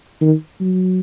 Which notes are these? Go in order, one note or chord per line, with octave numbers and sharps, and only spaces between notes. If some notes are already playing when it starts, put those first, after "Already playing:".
D#3
F#3